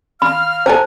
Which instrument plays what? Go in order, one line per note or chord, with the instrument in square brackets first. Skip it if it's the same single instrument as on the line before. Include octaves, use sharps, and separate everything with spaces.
[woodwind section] F5 F6 [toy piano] B5
[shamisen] A4 G#5 A#5 [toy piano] C5